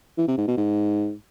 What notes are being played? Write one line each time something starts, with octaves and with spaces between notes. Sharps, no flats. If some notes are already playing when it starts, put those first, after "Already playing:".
E3
C3
G#2
B2
G#2